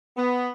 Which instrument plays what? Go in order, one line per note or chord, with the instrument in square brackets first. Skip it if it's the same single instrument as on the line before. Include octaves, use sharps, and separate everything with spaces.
[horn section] B3